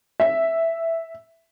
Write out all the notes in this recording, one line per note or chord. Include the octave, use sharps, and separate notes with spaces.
E5